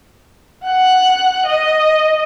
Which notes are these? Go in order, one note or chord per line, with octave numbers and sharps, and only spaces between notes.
F#5 F#6
D#5